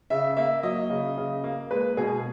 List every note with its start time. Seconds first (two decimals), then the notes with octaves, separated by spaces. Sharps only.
0.10 C#3 E5
0.37 A#3 E5
0.63 F#3 D#5
0.90 C#3
1.17 C#3
1.44 A#3
1.71 G#3 B4
1.97 B2 G#4